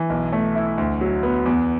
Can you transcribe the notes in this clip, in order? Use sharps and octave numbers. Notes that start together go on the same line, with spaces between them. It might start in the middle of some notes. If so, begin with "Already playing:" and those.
Already playing: E3
B1
A3
E4
D2
F#3
B3
E2